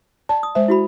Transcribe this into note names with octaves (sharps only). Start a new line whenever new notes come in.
D5 A5
D#6
G#3 C5 E5
E4 F#4 B5